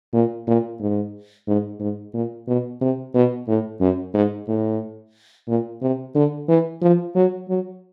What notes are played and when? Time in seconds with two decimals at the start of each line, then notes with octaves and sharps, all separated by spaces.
0.14 A#2
0.48 A#2
0.81 G#2
1.48 G#2
1.80 G#2
2.14 A#2
2.48 B2
2.81 C3
3.15 B2
3.48 A2
3.81 F#2
4.14 G#2
4.48 A2
5.48 A#2
5.82 C3
6.15 D3
6.49 E3
6.82 F3
7.16 F#3
7.49 F#3